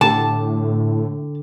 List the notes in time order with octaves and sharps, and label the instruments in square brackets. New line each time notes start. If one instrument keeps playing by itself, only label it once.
[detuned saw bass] A2 [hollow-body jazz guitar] D3 G4 [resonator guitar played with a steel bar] A5